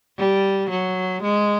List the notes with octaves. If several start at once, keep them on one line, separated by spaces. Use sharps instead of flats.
G3
F#3
G#3